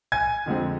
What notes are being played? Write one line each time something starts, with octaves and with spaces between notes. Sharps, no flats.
G#5 G#6
F2 D3 G#3 C4